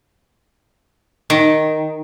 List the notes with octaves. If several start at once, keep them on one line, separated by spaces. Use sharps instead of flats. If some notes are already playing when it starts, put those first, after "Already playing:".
D#3